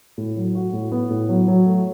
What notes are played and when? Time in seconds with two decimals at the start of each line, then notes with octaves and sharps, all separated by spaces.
0.18 A2
0.36 F#3
0.55 F#4
0.73 A2
0.92 B3
1.10 A2
1.29 F#3
1.48 F#3
1.66 A3